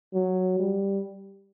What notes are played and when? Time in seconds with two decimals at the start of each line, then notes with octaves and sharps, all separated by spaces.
0.14 F#3
0.59 G3